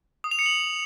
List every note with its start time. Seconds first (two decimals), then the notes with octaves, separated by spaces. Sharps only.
0.24 D#6
0.31 F7
0.39 C#7
0.46 F#7